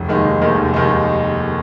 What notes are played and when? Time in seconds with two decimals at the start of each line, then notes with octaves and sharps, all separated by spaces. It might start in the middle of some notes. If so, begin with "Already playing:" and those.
Already playing: F1
0.08 D#2 D#3 G#3 D#4
0.24 F1
0.41 D#2 D#3 G#3 D#4
0.57 F1
0.74 D#2 D#3 G#3 D#4